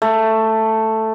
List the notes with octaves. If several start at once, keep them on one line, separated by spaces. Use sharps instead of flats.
A3